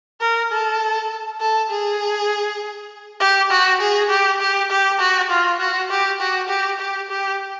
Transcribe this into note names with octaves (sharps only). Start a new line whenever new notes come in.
A#4
A4
A4
G#4
G4
F#4
G#4
G4
G4
G4
F#4
F4
F#4
G4
F#4
G4
G4
G4